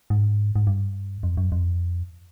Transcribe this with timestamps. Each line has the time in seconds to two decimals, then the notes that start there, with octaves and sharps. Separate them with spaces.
0.10 G#2
0.56 G#2
0.67 G2
1.23 F2
1.37 F#2
1.52 F2